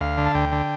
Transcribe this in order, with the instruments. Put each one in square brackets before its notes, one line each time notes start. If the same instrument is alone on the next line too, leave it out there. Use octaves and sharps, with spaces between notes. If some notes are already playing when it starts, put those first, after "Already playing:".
[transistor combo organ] D2 F5
D3
A5
D2 G5
D3